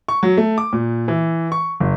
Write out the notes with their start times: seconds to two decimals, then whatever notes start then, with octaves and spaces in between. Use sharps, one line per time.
0.08 C#6
0.23 F#3
0.37 A3
0.58 D6
0.73 A#2
1.08 E3
1.52 C#6
1.80 F#1